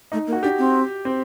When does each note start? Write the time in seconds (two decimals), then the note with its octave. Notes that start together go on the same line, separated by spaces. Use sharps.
0.12 A3 D#4
0.27 A#3
0.33 F#4
0.43 D4 G4
0.58 C4
1.05 C4